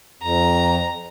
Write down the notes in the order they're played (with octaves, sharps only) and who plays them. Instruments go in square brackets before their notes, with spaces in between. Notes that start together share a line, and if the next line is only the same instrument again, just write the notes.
[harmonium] F2 [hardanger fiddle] A#5